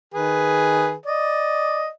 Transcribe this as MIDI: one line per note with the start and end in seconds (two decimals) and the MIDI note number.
0.14 0.94 51
0.14 0.94 68
0.14 0.94 71
1.06 1.89 74
1.06 1.89 75